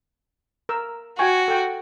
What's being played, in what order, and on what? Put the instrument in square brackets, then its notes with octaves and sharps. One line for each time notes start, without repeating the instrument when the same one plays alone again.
[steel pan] A#4 E6
[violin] F#4 [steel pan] G5 G#5 C#6
[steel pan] A4 G5